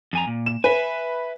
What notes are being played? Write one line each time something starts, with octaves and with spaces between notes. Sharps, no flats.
F2 G#5 A#5
A#2
E7
B4 E5 G#5